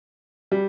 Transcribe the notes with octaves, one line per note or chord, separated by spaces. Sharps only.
G3